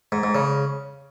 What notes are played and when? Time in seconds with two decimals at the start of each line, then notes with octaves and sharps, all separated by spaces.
0.12 G#2
0.23 G#2
0.35 C#3